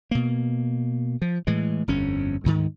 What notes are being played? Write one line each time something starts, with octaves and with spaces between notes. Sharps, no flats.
B2 A#3
F3
A2 E3 G#3
G1 F2 C#4
D2 G#2 D#3